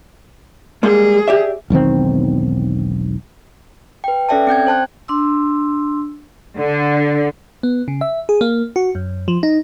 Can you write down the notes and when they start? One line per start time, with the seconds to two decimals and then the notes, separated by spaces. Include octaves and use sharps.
0.83 G3 G#3 A#3 G#4
1.28 G4 D5 E5
1.70 E1 B1 D#3 C4
4.04 B4 G5
4.29 C#4 A4 D5 E5 G5 A5
4.47 C4 G5 G6 G#6
4.67 C5 A5 F#6
5.08 D4 C6 E6
6.57 D3
7.63 B3
7.88 C#3
8.01 E5
8.29 G#4
8.41 A#3
8.76 F#4
8.95 F#2
9.28 F3
9.43 D#4